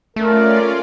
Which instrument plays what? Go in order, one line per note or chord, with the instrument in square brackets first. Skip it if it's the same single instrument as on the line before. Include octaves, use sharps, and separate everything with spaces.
[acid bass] A3 [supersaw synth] C#4 F4 D5 [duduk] A#4